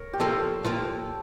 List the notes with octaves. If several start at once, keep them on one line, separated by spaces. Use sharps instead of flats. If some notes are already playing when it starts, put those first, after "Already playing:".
Already playing: A#4 C#5
G4
A#2 F3 A#3 A4
A#2 F3 A#3